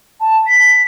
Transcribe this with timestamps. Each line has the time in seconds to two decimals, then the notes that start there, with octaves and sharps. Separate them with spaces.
0.20 A5
0.47 B6